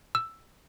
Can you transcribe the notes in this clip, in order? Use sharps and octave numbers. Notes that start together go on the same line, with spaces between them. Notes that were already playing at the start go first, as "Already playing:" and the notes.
E6